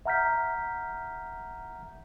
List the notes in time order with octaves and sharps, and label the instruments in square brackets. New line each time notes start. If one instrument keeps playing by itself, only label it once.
[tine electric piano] E5 F#5 A#5 F6 G6 B6